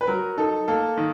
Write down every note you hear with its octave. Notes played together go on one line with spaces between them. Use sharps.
B4
F#3 A#4
D#4 A4
A#3 A4
D#3